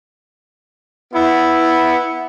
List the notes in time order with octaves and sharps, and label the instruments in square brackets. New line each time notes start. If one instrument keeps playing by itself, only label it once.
[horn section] B3 E4